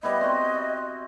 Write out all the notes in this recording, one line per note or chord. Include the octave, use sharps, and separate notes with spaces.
G3 B3 E4 D#5
C4 F#4